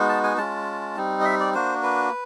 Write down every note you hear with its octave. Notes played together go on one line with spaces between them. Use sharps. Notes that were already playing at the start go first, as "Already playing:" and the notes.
Already playing: G#3 B3 D#4 F#4
A5
G#5
G#3 C#4 F4 A5
G3 C4 D#4
D#5
E5
D5
A#3 D4 F#4 C5
B4